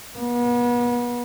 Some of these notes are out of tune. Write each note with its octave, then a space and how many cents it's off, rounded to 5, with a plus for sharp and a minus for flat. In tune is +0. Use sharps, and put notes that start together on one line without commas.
B3 -35